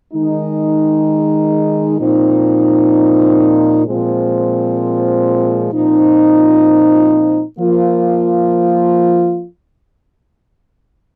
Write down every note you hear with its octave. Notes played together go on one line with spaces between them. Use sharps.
D#3 G#3 D#4
A#2 F3 C4 D#4
A#2 F3 G#3 C4
A#2 F3 C4 D#4
F3 A#3 F4